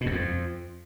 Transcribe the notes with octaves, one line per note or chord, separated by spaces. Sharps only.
B2
F#2
F2